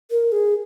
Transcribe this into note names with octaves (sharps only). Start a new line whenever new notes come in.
A#4
G#4